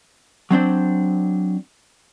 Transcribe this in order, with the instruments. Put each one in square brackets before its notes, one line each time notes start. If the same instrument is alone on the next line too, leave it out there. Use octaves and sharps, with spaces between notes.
[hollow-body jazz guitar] F#3 C4 D4 C5